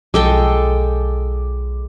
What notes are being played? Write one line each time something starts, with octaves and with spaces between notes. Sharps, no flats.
B1 F3 G#3 A4 G5 D6